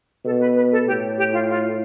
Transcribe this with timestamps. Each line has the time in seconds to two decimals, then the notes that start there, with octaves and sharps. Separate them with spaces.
0.24 B2 A4
0.40 B4
0.56 B4
0.72 A4
0.87 A2 G4
1.18 G4
1.33 F4
1.49 F4